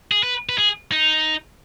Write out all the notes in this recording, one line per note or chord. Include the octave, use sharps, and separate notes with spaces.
G#4
B4
B4
G#4
D#4